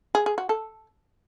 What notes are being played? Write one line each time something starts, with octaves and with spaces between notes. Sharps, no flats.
G#4
G#4
F#4
A4